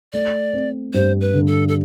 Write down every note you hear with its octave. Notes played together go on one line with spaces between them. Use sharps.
A3 D5
C4
G2 C5
B4
D3
A4
A4